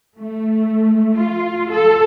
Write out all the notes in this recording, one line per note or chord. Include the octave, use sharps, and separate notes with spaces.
A3
F4
A4